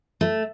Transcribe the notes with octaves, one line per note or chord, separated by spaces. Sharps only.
A3